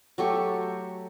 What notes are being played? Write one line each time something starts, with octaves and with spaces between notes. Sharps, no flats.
F#3 A3 G4 C#6